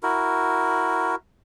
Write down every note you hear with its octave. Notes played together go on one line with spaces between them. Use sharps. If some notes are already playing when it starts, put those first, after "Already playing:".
E4 F#4 A#4